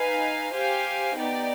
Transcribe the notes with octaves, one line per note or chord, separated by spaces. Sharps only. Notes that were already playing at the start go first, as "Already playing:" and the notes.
Already playing: D#4 B4 F5 G#5
G4 C5 F5 G#5
B3 D#4 G4 D5